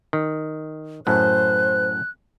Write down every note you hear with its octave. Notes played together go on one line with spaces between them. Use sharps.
D#3
F#2 A2 C5 F#6